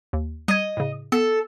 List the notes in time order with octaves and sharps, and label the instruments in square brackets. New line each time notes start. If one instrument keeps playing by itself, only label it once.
[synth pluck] D#2
[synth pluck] G3 G#6 [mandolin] D#5
[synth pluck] A2 C#3
[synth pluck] B3 [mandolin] A4